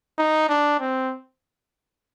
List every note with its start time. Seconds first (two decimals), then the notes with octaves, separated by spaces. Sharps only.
0.18 D#4
0.49 D4
0.80 C4